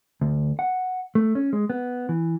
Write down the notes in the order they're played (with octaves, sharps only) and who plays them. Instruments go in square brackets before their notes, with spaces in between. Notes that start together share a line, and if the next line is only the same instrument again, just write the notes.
[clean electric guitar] D2
F#5
A3
C#4
G#3
B3
E3